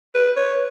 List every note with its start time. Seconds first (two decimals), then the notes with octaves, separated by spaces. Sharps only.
0.15 B4
0.36 C#5